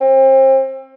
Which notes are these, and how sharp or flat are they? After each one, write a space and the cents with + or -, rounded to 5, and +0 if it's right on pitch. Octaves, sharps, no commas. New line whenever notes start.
C4 +30